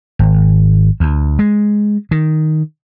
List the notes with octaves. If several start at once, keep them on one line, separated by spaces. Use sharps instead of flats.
G#1
D2
G#3
D#3